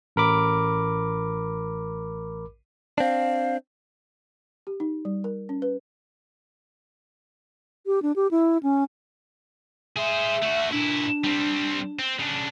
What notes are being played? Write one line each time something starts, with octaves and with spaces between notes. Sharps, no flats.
A1 A#4 B5 D6
C4 D4 F5
G4
D#4
G3
A#4
C#4
B4
G4
D4
G4
E4
C#4
G#4 C5 E5
A3 F#4
A#2 D4 E4
G3 C4
C4
C#3 D4